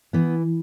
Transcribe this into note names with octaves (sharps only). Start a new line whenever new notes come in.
E3 B3